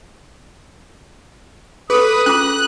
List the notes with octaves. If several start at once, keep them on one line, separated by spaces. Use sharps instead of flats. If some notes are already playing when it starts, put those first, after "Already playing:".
G#4 A4 B4 D#6
C#4 F4 D6 F#6